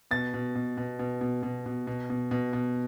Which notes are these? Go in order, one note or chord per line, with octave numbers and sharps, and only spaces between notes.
B2 A6
B2
B2
B2
B2
B2
B2
B2
B2
B2
B2
B2